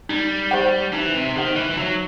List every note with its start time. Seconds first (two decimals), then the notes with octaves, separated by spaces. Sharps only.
0.09 G3 D#4
0.51 G4 C5 F#5
0.93 E3 D#4
1.14 C3
1.36 D#3 G4 C5 F#5
1.56 E3
1.71 E3
1.77 F#3 D#4